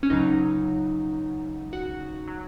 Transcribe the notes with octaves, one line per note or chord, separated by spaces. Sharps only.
C#4
C#2 C#3 F#3 D#4
F#4
F#3